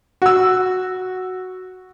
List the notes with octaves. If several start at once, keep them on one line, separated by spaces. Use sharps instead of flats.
F#4 E6